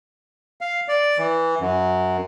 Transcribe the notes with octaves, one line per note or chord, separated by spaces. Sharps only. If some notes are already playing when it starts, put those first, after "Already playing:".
F5
D5
E3
F#2